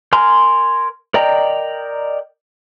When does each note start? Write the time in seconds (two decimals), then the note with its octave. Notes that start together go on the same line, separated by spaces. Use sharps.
0.13 A#4 G#5 A#5 C6 F6
1.14 A#4 D5 D#5 G5 A#5